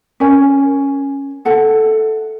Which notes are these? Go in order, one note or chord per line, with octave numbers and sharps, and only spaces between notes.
C#4 A#4 C#5 G#5
E4 A4 F#5 A5